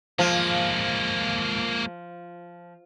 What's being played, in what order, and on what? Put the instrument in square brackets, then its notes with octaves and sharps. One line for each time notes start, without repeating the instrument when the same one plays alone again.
[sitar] F3 [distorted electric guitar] G#3 A#3